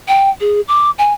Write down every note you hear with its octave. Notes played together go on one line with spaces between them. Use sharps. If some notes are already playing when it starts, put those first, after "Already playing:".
G5
G#4
D6
G#5